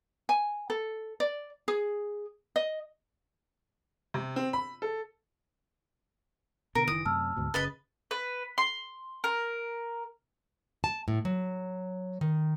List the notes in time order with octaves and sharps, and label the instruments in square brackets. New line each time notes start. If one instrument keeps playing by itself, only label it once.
[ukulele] G#5
A4
D5
G#4
D#5
[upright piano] C3
C4
B5
A4
[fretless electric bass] B2 D3 [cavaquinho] A#4 [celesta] A#6 D7
[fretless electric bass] F#1 D#3 E3 [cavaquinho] D#6
[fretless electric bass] F#2 C3 A3 [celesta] A5 E6 F6
[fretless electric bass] D2 G#2 B2
[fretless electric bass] F#1 C#3 [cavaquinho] B4 D#5 B5 [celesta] A6
[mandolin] B4
C6
A#4
[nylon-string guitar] A5
A2
F#3
D#3